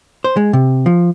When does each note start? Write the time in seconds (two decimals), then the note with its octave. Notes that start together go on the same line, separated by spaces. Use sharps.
0.24 C5
0.37 G#3
0.53 C3
0.86 F3